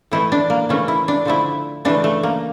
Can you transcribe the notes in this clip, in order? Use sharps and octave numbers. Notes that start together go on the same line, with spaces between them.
A2 E3 A3 E4
D4
A#3
C#3 E3 A3 C#4
E4
D4
D3 F3 A3 E4
C#3 E3 A3 D4
A3
A#3